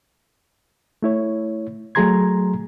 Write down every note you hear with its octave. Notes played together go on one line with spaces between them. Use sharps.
A3 E4 C#5
F#3 A3 G#4 A#5 C6 G#6